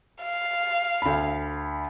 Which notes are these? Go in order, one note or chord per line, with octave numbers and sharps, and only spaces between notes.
F5
D2 B5